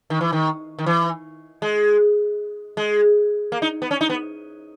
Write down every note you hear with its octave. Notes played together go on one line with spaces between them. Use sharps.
D#3
E3
D#3
D#3
E3
G#3
G#3
A#3
D#4
B3
C#4
D#4
B3